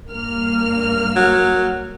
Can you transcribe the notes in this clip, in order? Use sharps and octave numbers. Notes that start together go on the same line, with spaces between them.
G2 A#3 F6
F#3